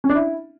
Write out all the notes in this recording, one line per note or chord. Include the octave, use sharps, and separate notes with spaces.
C#4
D4
E4